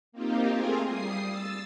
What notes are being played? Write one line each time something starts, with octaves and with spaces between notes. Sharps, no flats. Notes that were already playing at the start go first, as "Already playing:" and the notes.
A#3 C4 D#4 F4 G4
A3 C4 F4 G#4 A#4 G#5
G3 D#6 C7
E6 A6